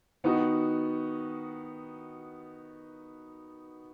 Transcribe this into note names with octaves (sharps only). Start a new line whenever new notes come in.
D#3 B3 D#4 F#4